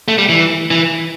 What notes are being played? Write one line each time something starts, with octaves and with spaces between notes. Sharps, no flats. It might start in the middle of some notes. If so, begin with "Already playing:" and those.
A3
G3
E3
E3